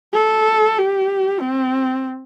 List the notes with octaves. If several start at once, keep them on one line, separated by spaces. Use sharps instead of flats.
A4
G4
C4